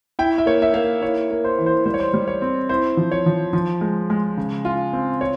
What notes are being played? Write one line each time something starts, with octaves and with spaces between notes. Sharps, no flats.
E4 G5
E5
A#3 C#5
E5
A#3 F5
E4 C#5
A#3
C5
E3
C5
G3 C5
C#5
C5
G3
C#5
C4
E4 C5
F3
C#5
F3
F3
G#3
G#3
C#3
F4
C4
F4 C#5